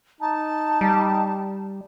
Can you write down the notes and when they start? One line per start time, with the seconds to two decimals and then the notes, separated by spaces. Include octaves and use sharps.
0.21 D#4 A5
0.81 G3